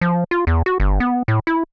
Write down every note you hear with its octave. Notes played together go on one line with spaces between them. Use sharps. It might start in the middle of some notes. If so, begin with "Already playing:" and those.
F3
F4
E2
F#4
G1
B3
A2
E4